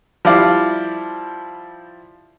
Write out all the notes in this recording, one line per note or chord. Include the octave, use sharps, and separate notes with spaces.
F3 G3 E4 D5 F5